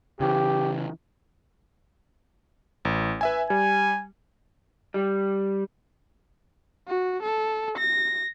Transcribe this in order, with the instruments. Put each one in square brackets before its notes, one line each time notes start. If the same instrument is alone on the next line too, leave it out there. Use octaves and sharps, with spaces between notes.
[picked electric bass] C#3 E3 [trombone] G4
[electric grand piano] A1
B4 E5 G#5
[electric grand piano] G3 [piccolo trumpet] G#5
[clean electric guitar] G3
[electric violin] F#4
A4
A#6